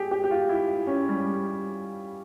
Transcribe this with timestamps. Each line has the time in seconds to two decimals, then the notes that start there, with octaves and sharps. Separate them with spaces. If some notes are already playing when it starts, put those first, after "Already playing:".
Already playing: G4 G#4
0.11 G4
0.24 G4
0.31 F4
0.49 E4
0.87 C#4
1.09 G3